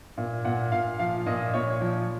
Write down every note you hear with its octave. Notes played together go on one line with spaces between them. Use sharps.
A#2
A#2 F#5
A#2 F5
F3 F5
A#2 D#5
A#2 C#5
F3